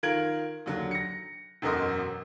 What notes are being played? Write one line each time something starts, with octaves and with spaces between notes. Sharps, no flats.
D#3 F4 A#4 G#6 D7 F#7
D#2 D3 F#3
A#6 C#7
E1 F#2 B2 A#4 D#5 C6